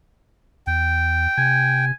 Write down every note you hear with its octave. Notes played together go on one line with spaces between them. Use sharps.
E2 G5
C3 G#5